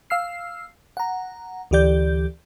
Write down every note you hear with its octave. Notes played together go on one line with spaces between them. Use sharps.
F5 E6 F6 C7
F#5 A#5
D2 E3 G4 D5 G6